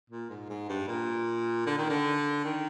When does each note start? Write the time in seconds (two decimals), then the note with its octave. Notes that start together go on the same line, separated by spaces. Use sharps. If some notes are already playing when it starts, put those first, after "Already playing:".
0.10 A#2
0.30 G#2
0.49 G#2
0.69 G2
0.88 A#2
1.66 D3
1.78 D#3
1.89 D3
2.44 D#3